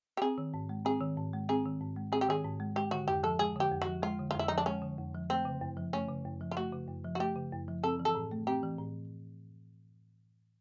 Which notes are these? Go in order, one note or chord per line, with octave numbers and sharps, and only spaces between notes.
G4
C4 G#4
D#3
G#2
G#3
C4 G#4
D#3
G#2
G#3
C4 G#4
D#3
G#2
G#3
C4 G#4
G4
D#3 G#4
G#2
G#3
G#3 G4
D3 F#4
F2 G4
F3 A4
G#3 G#4
D3 G4
F2
F#4
F3
G#3 F4
D3
F4
F2
E4
F3 D#4
D4
G#3 C#4
D3
F2
F3
A3 C4
C#3
F#2
F3
A3 C#4
C#3
F#2
F3
F4
A3 F#4
C#3
F#2
F3
F#4
A3 G4
C#3
F#2
F3
C4 A4
E3
A4
A2
A3
C4 G4
E3
A2